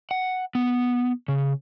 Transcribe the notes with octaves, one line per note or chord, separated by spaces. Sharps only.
F#5
B3
C#3